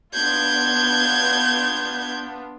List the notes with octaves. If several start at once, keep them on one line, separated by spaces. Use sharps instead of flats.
B3 D4 F4 G6 G#6